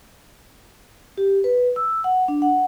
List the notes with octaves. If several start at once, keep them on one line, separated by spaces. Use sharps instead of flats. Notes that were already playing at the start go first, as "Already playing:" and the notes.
G4
B4
E6
F#5
D4
F#5